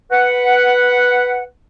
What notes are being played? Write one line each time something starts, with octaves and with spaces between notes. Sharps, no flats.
B4 F#5